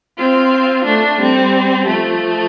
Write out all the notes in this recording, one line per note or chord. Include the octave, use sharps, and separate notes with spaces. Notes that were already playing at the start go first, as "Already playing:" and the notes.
C4 F4
A3 D4
G3 C4
F3 A3